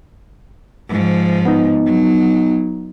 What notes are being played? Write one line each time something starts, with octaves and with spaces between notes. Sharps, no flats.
G#2 F3
B3 D#4
F#3